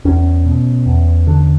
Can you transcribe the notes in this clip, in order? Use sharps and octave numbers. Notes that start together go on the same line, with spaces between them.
E2 C#4
B2
E2
D3